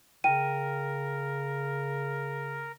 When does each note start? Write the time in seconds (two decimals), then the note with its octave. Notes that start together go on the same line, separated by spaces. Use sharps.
0.24 C#3 A#4 G5 D#7